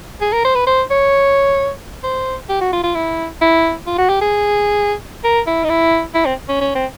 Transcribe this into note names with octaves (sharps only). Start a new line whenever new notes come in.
G#4
A#4
C5
B4
C5
C#5
C5
G4
F#4
F4
F4
E4
E4
F4
F#4
G4
G#4
A#4
E4
D#4
E4
E4
C4
C#4
C#4
C4